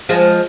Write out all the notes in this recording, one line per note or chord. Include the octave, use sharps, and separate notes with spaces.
F3 G#3